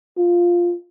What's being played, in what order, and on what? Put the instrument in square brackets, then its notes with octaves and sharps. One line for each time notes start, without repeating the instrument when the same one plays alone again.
[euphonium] F4